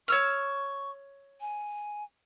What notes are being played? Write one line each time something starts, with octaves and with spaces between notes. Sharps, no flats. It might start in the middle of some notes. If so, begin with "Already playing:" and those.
C#5 C#6 E6 F6
G#5